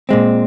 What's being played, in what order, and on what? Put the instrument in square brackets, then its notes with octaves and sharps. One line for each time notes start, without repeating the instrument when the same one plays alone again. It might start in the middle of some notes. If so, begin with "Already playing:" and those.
[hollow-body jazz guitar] A#2 G#3 C4